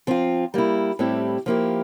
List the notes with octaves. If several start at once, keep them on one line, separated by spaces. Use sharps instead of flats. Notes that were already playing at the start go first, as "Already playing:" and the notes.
F3 C4 F4
G3 A#3 E4
A2 G3 C4 E4 G4
F3 A#3 E4 G4